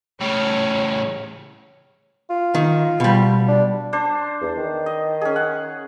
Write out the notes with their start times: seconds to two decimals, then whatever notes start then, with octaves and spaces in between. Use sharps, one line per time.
0.21 A2 C#3 C#5
2.30 F4
2.55 D#3
3.00 B2 G3
3.48 D4
3.93 D4 C5
4.40 E2
4.57 D#3
4.86 D#5
5.21 C#4 G#4
5.36 F#5